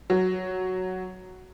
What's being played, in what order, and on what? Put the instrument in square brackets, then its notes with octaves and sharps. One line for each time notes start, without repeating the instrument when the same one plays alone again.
[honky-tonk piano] F#3